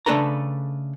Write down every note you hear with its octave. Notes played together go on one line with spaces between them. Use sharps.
C#3 A3 D4 A4 B4 A#5